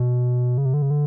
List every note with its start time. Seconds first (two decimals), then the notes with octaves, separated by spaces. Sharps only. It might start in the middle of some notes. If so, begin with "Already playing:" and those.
Already playing: B2
0.58 C#3
0.65 C3
0.74 D3
0.82 C#3
0.90 D3